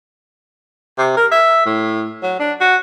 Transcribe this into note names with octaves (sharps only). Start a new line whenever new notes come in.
C3
A#4
E5
A2
F#3
D4
F#4